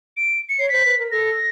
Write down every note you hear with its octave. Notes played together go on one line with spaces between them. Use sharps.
D7
C#7
C#5 C7
C5 B6
B4
A#4
A4 A#6